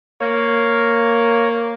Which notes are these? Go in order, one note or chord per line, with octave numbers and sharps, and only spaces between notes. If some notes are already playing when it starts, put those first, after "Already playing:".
A#3 C#5